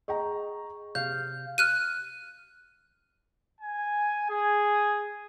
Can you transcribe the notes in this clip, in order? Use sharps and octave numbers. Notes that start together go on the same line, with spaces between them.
G#4 D#5 G5 A#5 C#6
C3 F5 G6
F6 F#6 D#7
G#5
G#4